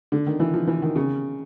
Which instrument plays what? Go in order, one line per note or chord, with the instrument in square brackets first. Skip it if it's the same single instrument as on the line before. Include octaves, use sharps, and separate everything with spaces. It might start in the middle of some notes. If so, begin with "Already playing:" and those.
[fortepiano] D3
D#3
E3
F3
E3
D#3
C#3